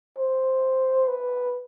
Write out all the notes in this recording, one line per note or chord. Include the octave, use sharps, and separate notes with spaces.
C5
B4